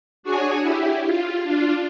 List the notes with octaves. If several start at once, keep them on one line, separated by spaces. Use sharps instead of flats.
D4 F#4 G#4 C#5 G#5
E4 G4
F4
D4 F4